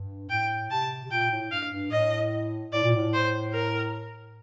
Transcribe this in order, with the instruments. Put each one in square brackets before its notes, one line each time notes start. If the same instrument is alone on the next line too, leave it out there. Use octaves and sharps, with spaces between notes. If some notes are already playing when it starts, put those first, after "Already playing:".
Already playing: [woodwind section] G2
[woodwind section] A2 [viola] G5
[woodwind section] C3 [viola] A5
[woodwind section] C3
[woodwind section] A#2 [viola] G5
[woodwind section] A2
[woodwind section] G2 [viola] F5
[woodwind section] G2
[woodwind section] A2 [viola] D#5
[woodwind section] A2 [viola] D5
[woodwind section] A#2
A2
[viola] C5
A#4